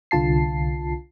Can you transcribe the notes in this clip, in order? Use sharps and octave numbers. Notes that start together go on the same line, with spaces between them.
C2 D3 F4 A5 C7